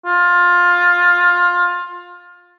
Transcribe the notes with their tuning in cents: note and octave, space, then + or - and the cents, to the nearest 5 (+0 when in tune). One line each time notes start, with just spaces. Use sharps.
F4 +15